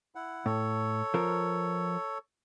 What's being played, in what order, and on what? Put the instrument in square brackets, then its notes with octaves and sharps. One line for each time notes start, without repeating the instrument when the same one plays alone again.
[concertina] E4 F#5
[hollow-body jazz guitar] A2 [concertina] A4 C#5
[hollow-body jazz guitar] F3 A#4